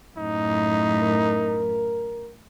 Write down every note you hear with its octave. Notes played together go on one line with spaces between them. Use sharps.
F#2 A2 D#4
A#4